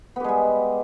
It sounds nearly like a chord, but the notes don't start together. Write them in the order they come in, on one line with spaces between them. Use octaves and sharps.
B3 G4 G#3 G3